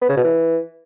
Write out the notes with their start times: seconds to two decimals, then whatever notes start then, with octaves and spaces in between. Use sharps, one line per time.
0.02 B3
0.09 C#3
0.16 B2
0.24 E3